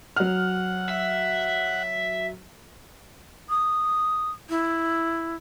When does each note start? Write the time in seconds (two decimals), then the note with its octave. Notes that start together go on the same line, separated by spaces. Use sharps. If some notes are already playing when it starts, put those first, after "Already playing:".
0.16 F#3 F#5 F6
0.89 E5
3.50 D#6
4.50 E4